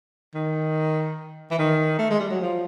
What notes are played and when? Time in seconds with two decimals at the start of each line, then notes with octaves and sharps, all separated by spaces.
0.34 D#3
1.51 E3
1.59 D#3
1.99 A3
2.10 G#3
2.20 G3
2.31 F#3
2.41 F3